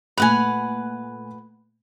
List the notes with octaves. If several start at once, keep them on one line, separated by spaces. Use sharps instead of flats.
A#2 A3 B4 F#5 G#5 F7